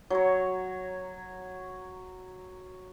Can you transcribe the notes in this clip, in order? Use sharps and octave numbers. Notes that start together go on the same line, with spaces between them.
F#3 C#5